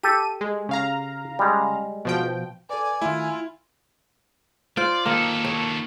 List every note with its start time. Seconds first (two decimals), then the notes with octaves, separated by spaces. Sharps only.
0.03 G4 A4 D#7
0.41 G#3
0.69 C#3 F5 A#5
1.39 G3 G#3
2.05 B2 F3 G5
2.70 A4 B4 D5 G#5
3.02 D#3 A3 E4 F4
4.77 F4 C5 D5
5.06 D#3 A#3 A4
5.44 C#5